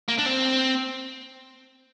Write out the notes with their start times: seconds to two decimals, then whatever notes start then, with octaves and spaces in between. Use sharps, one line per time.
0.09 A#3
0.19 D4
0.26 C4